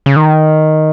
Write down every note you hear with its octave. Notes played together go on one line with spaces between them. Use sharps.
C#3
D#3